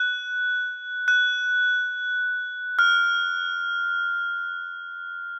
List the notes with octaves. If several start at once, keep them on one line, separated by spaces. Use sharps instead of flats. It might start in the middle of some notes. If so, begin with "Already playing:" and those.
Already playing: F#6
F#6
F6